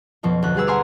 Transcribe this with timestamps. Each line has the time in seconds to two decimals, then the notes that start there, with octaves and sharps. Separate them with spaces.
0.23 F2 B2 F3 C#4
0.43 D2 F#6
0.55 G3 F#4 G#4 B4 E6
0.67 F#5 G#5 A#5 C6 D6 F6